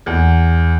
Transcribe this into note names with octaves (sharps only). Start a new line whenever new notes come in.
E2